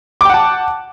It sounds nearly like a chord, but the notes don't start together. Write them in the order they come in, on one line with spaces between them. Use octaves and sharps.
D6 G5 F#5 A5